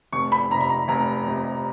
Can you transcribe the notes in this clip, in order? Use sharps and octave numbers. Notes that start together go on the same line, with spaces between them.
F1 C#6
B5
F2 C3 A#5
B5
A#5
F1 A#5
F2 C3